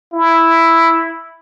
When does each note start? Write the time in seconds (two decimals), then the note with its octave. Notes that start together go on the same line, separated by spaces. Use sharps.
0.14 E4